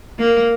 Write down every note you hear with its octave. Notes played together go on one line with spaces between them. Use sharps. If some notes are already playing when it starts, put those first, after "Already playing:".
A#3